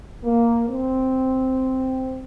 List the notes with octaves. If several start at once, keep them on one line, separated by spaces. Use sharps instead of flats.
A#3
C4